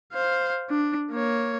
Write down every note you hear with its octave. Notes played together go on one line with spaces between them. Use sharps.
C5 F5
D4
A#3 C#5